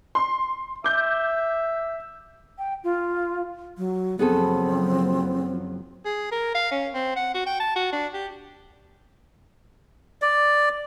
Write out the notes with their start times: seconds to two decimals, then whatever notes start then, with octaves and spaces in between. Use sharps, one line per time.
0.15 C6
0.84 E5 D6 G6
2.58 G5
2.84 F4
3.78 F#3
4.19 F#1 F3 F#3 B3 C4 G#4 A4
6.05 G#4
6.32 A#4
6.55 F5
6.71 C#4
6.94 C4
7.16 F#5
7.34 F#4
7.46 G5
7.60 A5
7.76 F#4
7.92 D4
8.14 G4
10.22 D5